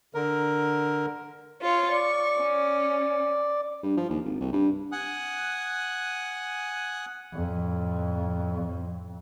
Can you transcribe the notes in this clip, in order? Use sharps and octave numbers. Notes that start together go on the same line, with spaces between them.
D3 A#4
F4 C#5
D5 C#6
C#4
G2
F3
D#2
G#1
C2
G2
F#5 G#5 D#6 F#6
F2 A2